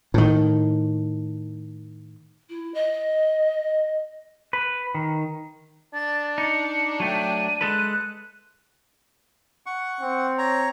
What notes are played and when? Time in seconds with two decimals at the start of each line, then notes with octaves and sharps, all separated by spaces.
0.14 A2 D#3
2.49 E4
2.74 D#5
4.53 B4
4.95 D#3
5.94 D4 A6
6.38 D#4 D6 C#7
7.00 F#3 A3 G5 D#7
7.61 G#3 A4 B4 F#6
9.66 F#5 C#6
10.01 C4
10.38 C#5 A#5